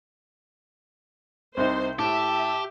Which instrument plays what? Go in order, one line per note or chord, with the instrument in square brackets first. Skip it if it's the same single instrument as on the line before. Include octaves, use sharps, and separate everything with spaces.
[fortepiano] C2 C3 D#4 [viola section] C5
[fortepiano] A2 [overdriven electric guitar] G4 [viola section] E5 [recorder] A5